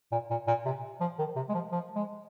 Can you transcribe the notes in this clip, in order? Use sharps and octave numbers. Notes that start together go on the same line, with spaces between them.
A#2
A#2
A#2
C3
F3
D#3
C3
G#3
F3
F3
G#3